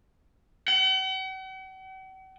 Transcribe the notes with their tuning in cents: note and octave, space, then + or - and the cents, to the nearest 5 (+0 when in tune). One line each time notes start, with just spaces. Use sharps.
F#5 +45